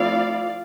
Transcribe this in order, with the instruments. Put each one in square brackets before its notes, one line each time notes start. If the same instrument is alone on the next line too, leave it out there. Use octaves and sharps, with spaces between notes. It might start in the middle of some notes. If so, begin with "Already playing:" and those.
Already playing: [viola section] F3 A3 C4 E4 D5 F5